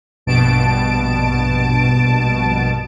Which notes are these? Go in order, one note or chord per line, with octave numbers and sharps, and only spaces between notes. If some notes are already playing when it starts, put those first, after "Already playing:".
A#1 G2 B2 A5 D7